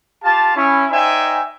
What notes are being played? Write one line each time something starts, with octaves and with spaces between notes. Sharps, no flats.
F4 G4 F5 A5
C#4 E4
D#4 C5 D5 E5 G5 G#5